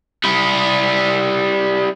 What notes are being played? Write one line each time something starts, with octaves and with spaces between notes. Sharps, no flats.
G3 E4